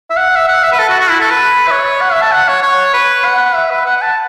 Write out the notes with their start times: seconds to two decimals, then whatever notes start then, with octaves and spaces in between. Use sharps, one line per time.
0.10 E5
0.17 F#5
0.36 E5
0.48 F#5
0.64 E5
0.72 B4
0.79 A4
0.89 F#4
1.00 F#4
1.10 E4
1.20 A4
1.30 B4
1.67 E5
1.71 C#5
2.01 F#5
2.12 E5
2.22 A5
2.32 F#5
2.48 C#5
2.63 C#5
2.94 B4
3.25 F#5
3.55 E5
3.70 B4
3.86 F#5
3.97 F#5
4.02 A5